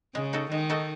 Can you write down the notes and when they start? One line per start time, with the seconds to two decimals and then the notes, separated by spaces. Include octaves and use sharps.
0.15 C#3 G#3
0.33 D#4 F#4 A4
0.51 D#3 G#3
0.70 D#4 F#4 A4